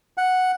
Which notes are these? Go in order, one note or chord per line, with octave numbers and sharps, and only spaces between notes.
F#5